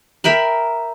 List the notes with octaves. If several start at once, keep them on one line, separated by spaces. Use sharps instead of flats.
A#4 E5 G5 B5